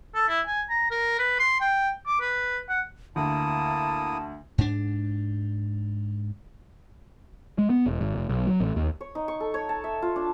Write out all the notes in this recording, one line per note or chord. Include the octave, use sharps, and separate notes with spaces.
A4
E4
G#5
A#5
A#4
B4
C6
G5
D6
B4
F#5
D2 A#3 E4 A5 D#6
G#2 D4
G#3
B3
E1
G#1
F1
B1
F#3
A1
D#2
C#5
D#4
C#6
A4
C#5
A5
E5
F4
D4